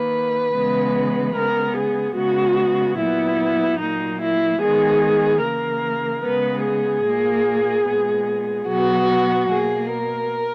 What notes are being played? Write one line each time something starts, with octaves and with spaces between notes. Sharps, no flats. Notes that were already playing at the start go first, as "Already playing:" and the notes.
Already playing: D#3 A#3 B4
C#3 E3 G#3 B3
C#3 G#3 B3 A#4
G#4
C#3 G#3 B3 F#4
A#2 F#3 B3 E4
A#2 F#3 A#3 D#4
E4
D#3 G#3 B3 G#4
C#3 E3 A#3 A#4
C#3 G#3 B3 B4
G#4
A#2 A#3
A#2 G#3 B3
B2 F#3 B3 F#4
B2 A#3 G#4
A#4